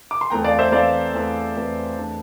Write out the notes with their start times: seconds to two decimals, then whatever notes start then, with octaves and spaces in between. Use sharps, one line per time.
0.11 D6
0.21 C6
0.30 E2 E3 A3 C4 G5 A#5
0.44 D5 F5
0.59 C5 E5
0.72 E2 E3 A3 C4 D5 F5
1.13 E2 E3 A3 C4
1.56 E2 E3 A3 C4
1.97 E2 E3 A3 D4